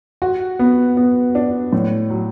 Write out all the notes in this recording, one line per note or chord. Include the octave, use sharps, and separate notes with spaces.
F#4
B3
B3
D4
A2
F#3